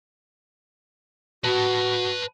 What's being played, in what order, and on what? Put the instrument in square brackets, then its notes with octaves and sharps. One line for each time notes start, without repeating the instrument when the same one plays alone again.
[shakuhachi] F#4 [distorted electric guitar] B4 A5